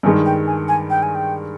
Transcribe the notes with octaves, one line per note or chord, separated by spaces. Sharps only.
G2 D#3 G#3 G#5
G5
G#5
G#5
G5
G#5
G5